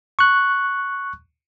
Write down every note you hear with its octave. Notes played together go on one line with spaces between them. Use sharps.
C#6 F#6